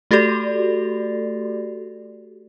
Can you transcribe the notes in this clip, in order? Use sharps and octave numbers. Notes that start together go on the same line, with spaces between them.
A3 F#4 G4 A4 D5